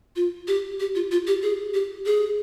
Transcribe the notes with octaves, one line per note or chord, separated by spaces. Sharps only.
F4
G4
G4
F4
F4
G4
G#4
G4
G#4